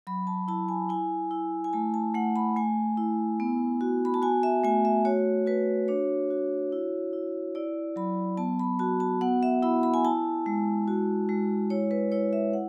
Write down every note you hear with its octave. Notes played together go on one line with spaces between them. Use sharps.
F#3 B5
A5
E4 A5
G#5
E4 G#5
E4
G#5
A3 A5
A5
A3 F#5
B5
A3 G#5
E4
B3
F#4
B5
A5
F#4 G#5
E5
A3 G#5
E5
F#4 C#5
F#4 B4
D4 C#5
F#4
E4
E4
E4 D5
F#3 B5
B3 A5
B5
F#4 A5
A5
B3 F#5
E5
E4 B5
B5
G#5
E4 A5
G#3
F#4
G#3
E4 C#5
B4
E4 C#5
E5
F#5